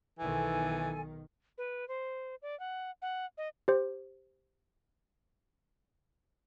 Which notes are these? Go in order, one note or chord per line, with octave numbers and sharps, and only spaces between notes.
B1 D#3 E3 A4 G#5
B4
C5
D5
F#5
F#5
D#5
G4 C5